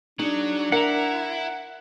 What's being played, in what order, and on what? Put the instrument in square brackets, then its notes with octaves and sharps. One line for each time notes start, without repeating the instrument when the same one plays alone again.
[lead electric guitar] F#3 [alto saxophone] D4 [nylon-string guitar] D#4 G#4
[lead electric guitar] E4 [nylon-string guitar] A#4 [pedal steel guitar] F#5 A#5